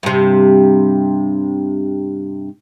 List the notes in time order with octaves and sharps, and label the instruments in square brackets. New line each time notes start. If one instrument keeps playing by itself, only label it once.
[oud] G2 C3